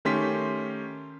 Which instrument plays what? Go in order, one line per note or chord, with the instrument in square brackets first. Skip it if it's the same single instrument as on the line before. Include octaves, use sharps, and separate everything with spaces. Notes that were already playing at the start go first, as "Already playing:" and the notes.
[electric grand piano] D#3 A3 C#4 G4 C6 B6